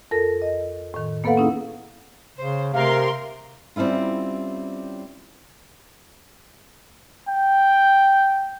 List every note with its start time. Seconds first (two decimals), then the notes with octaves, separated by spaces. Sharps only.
0.11 F2 A4 A#4 A#6
0.42 D#5
0.94 A2 D#3
1.24 A#3 B3 A4 B4 F5 F#5
1.37 C#4 D#4 E4 G#4
2.38 C#3 C5
2.73 C3 A3 A#4 F5 C6
3.76 G3 C4 C#4 E4 F4
7.28 G5